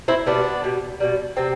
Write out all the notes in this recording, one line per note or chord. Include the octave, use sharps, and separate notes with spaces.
C4 E4
B2 G3 B3 D4
B2 G3
B2 G3
C3 C4